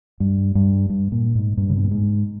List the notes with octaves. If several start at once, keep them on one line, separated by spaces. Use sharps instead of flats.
G2
G2
G2
A#2
G#2
G2
C#3
B2
A#2
G#2